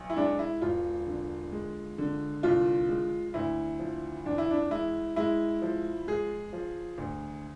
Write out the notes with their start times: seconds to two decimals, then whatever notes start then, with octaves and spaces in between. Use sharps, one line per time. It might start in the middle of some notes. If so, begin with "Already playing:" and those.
Already playing: B1
0.10 E4
0.16 G#3 D4
0.39 E4
0.61 E1 F4
1.07 D3
1.52 G#3
1.98 D3
2.43 C2 F4
2.89 G#3
3.34 D2 E4
3.79 F3
4.25 E2 D4
4.38 E4
4.50 D4
4.70 G#3 E4
5.16 G#3 E4
5.62 F3
6.07 G#3 G#4
6.53 F3
6.98 D2